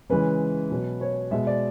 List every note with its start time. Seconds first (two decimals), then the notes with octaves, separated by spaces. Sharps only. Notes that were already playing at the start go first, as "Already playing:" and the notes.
0.09 C#3 E3 G#3 B4
0.71 B2 F#3
1.01 C#5
1.31 B2 G#3 E5
1.47 D5